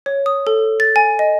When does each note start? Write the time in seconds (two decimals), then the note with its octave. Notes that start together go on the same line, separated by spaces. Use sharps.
0.06 C#5
0.26 D#6
0.47 A4
0.80 A6
0.96 G#5
1.19 D#5